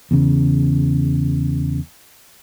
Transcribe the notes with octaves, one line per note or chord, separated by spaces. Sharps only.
E2 C#3